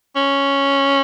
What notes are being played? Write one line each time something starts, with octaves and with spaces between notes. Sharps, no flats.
C#4